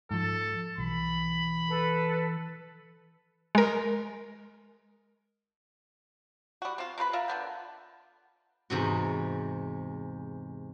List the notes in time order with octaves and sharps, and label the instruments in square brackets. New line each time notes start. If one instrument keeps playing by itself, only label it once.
[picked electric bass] G#2 F3 [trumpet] A4
[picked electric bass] B1 [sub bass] E3 [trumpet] B5
[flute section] A4 B4
[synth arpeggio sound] G#3 A#4
[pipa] G3 F#4
C4 F4
C3 F4 B4 B5
F4 A#4 E5
D3 B3 G5
[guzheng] E2 G#2 C3 F#4